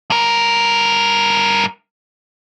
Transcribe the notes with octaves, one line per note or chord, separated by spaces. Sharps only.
G2 A#4